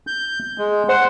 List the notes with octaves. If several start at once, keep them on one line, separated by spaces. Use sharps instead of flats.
G6
G#3
C5 F#5